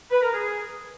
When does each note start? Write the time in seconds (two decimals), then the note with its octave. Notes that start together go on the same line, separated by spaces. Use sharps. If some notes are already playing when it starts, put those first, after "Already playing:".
0.11 B4
0.22 A#4
0.33 G#4